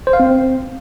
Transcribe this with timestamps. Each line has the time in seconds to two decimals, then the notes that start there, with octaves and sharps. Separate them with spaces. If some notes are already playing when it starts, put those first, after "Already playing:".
0.07 C5
0.13 F5
0.20 C4